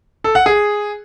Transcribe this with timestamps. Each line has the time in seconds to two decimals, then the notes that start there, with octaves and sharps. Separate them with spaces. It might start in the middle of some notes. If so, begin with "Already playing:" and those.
0.24 A4
0.35 F#5
0.46 G#4